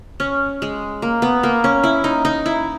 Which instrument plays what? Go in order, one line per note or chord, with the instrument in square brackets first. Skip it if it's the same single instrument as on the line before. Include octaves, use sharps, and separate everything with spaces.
[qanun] C#4
G#3
A#3
B3
A#3
C#4
E4
D#4
D#4
E4